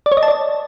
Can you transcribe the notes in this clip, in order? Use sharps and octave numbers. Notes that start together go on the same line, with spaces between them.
D5
C#5
D#5
A5
D5